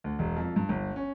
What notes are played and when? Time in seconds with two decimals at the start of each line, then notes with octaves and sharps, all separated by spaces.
0.04 D2
0.19 E1
0.36 F2
0.56 G2
0.69 G1
0.96 C#4